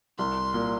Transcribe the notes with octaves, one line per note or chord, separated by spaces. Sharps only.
C2 C6
A#2